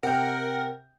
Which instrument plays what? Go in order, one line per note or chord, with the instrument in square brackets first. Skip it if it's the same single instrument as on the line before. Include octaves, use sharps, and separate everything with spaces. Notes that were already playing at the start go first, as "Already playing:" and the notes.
[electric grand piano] C3 G5 G6 [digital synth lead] A#4 [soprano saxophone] F#5